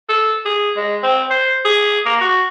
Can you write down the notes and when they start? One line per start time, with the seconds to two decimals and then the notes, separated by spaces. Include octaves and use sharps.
0.09 A4
0.45 G#4
0.77 G#3
1.03 C4
1.30 C5
1.65 G#4
2.06 A#3
2.21 F#4